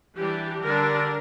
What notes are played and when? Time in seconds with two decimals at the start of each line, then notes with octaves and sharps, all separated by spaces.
0.17 E3 G3 D4 G4
0.62 D3 G3 D4 A#4